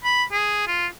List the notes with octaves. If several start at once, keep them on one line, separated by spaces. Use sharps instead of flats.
B5
G#4
F4